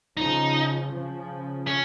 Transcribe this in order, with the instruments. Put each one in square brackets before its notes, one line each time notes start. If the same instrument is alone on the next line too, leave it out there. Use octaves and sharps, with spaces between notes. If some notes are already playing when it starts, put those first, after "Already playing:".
[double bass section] C#3 F3 [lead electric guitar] D#4
[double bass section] C#3 F3
[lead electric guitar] C#4